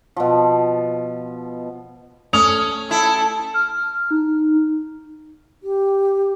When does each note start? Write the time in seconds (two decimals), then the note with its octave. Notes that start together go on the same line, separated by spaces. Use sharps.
0.16 B2 F3
2.33 A3 C#4 D#6 F7
2.91 E4 A4
3.54 F6
4.11 D#4
5.63 G4